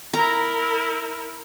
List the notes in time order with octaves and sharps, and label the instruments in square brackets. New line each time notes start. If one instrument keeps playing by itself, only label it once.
[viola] E4 A#4 [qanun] A#5